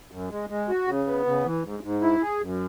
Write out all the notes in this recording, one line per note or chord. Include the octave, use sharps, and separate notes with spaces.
F#2
G#3
G#3
F#4
C#3
B3
C#3
E3
G#2
G#2
E4
G#4
F#2